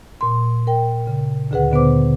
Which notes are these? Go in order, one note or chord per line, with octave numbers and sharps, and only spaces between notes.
A#2 C6
A#4 G5
C#3
D2 D3 G#4 B4 F#5
A#2 D3 B3 B4 C5 D6